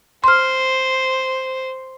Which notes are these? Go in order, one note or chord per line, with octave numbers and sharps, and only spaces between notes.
C5 C6 F6